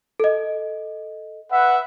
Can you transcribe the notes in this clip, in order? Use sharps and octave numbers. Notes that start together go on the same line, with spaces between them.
A4 D#5
B4 E5 F#5